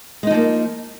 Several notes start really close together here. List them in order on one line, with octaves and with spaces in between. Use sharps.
G#3 D#4 F3 A#3